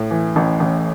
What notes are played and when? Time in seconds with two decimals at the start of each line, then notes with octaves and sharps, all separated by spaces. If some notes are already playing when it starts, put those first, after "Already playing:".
Already playing: A2
0.11 E3
0.36 A1
0.60 A1